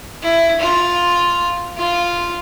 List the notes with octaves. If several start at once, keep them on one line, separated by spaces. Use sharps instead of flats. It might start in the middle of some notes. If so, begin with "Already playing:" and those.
E4
F4
F4